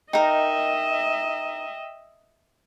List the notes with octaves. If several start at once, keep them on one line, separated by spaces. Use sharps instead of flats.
D#4 A#4 D#5 E5 G5